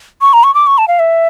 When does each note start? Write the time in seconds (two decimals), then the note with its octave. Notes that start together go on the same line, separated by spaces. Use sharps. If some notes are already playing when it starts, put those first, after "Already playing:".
0.21 C#6
0.33 A#5
0.44 C#6
0.54 D6
0.67 C#6
0.78 A5
0.88 F5
0.99 E5